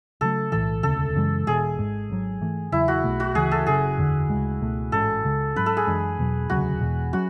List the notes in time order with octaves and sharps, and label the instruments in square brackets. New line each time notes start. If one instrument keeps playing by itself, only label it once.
[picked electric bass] D2 C#3 F#3 A3 [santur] A4
[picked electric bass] B1 A2 E3 [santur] A4
[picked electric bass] E1 D2 C#3 [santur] A4
[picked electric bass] F#2 C#3 E3 G#3
[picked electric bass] E1 E2 B2 [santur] G#4
[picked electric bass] G#1 G#2 G#3
G#1 G#2 F#3
G#2 E3 A3
[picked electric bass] E2 C#3 F#3 [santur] E4
[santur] F#4
[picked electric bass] B1 B2 A3
[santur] F#4
[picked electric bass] D2 C#3 E3 [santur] G#4
[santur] A4
[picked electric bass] F#1 F#2 C#3 [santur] G#4
[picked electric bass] F#1 E2 D3
D2 C#3 G#3
C#2 B2 A3
[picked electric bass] A1 G#2 G#3 C#4 [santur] A4
[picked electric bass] C#2 C#3 G#3
[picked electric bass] G#2 F#3 C#4 [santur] B4
[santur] A4
G#4
[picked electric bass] F#2 E3 G#3 D4
E2 B2 F#3
[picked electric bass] E1 D2 C#3 F#3 [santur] F#4
[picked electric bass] E1 E2 B2
[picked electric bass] F#3 C#4 [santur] F#4